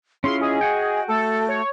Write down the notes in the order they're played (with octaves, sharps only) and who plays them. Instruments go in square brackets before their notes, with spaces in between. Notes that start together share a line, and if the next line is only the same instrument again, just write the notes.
[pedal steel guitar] C#4 E4 F4 [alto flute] G#4 [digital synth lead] C6
[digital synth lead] G#4 [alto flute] D#5
[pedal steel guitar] F#4 F#5 G5
[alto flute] A3 [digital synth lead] A4
[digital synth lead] C#5